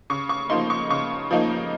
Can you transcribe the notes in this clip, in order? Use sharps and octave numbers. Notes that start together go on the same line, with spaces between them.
C#3 C#6
C#6
F3 A#3 D#4 C6
C#6
C#3 C#6
F3 A#3 D#4